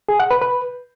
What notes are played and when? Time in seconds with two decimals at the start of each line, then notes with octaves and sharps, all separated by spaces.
0.09 G#4
0.20 F#5
0.31 B4
0.42 B4